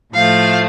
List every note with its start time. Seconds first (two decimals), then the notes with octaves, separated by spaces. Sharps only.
0.13 A2 F3 A3 F5